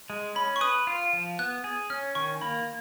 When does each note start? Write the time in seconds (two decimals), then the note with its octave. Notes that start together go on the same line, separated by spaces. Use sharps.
0.10 G#3
0.35 C#4 B5
0.56 C#6
0.61 B4 D#6
0.87 F4
1.13 F3
1.39 B3 F#6
1.64 G#4
1.90 C#4 F6
2.15 D#3 C#6
2.41 A#3 B5